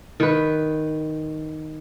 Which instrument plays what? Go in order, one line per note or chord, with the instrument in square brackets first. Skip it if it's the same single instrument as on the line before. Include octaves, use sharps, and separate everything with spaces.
[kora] D#3 B4